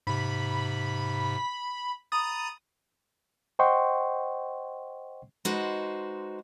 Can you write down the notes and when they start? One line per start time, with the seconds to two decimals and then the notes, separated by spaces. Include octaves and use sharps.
0.07 G#2 C3 B5
2.12 A#5 B5 D#6 A6
3.59 C5 D#5 F#5 G5 C6 C#6
5.45 G#3 D#4 F#4 B4 C5